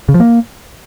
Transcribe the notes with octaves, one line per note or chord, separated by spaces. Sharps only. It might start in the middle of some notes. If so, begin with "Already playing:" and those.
C#3
F3
A#3